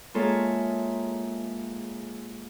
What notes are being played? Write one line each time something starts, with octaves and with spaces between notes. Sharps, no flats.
G#3 A#3 F4 A4 C#5 E5